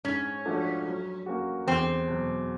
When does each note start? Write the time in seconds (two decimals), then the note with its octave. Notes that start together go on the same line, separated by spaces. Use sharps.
0.05 G#2 C#4
0.45 F3 A3 D4 F#4
0.86 F#3
1.26 A#3 C#4 F#4
1.67 E2 C4
2.08 B2 F#3